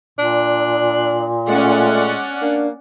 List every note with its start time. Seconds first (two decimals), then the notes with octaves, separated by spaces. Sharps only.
0.19 A#2 D4
1.48 G#3 A3 C#4 D5 F#5
2.42 A#3 D4